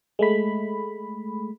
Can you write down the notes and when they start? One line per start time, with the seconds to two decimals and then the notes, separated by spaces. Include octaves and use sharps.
0.19 G#3 A3 B5